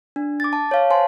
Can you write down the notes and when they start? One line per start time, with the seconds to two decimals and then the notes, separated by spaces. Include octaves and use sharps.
0.16 D4
0.40 D6 A6
0.53 A5
0.71 C#5 F5
0.90 C5 G#5 A5 C6